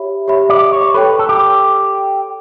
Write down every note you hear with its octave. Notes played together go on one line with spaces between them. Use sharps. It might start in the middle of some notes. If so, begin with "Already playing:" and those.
Already playing: G4 C#5 E5 B5
G4 C#5 E5 B5
D5
C#5
A4 B4 C#5 G5
A4
G4